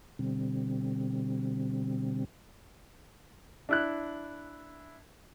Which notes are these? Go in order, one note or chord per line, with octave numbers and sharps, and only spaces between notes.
B2 D3 G3 C4
D4 E4 F#6